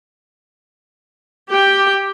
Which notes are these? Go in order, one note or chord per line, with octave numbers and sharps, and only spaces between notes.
G4 G5